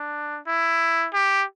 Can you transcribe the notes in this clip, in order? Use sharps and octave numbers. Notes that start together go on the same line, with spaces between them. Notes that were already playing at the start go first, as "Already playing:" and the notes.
Already playing: D4
E4
G4